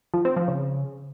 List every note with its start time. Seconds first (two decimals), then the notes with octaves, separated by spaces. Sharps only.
0.14 F3
0.25 C4
0.36 F3
0.48 C#3